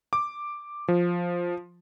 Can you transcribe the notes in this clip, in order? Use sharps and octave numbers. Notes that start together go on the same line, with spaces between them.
D6
F3